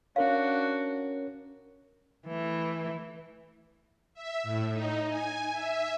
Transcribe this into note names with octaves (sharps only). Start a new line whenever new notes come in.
C#4 D4 F#4 A#4 C#5 F5
E3 A3
E5
A2
D#4
G#5
E5